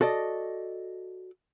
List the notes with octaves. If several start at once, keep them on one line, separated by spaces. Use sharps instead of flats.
F#4 A4 D5 D#5